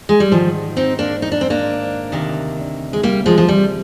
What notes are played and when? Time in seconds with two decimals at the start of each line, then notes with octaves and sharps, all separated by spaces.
0.09 G#3
0.20 G3
0.32 G#2 D#3 F3
0.77 C4 D#4
0.99 A#3 D4
1.22 D#4
1.32 D4
1.41 C4
1.50 A#3 D4
2.12 D2 C3 D#3
2.93 G#3
3.03 G3 A#3
3.26 F3 G#3
3.38 F3
3.48 G3